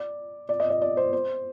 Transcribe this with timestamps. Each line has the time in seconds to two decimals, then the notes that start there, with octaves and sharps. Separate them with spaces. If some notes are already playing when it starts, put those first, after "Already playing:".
Already playing: D5
0.49 D5
0.60 D#5
0.70 D#5
0.82 D5
0.97 C5
1.13 C5